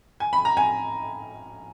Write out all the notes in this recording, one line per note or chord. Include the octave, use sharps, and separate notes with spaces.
G#5
B5
A#5
G#5